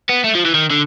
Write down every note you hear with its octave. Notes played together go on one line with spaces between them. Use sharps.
B3
A3
F3
E3
D#3
D3